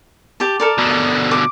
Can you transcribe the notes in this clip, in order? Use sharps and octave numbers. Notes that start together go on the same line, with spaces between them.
G4 A5
A4 A#4 D5
B2 D3
D6